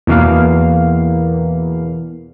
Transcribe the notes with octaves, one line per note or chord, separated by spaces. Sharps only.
E2 B2 E3 A#3 B3 F5